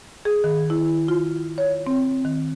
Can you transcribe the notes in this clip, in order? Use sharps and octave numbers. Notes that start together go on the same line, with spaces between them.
G#4
D#3
E4
F4
C#5
C4
D#3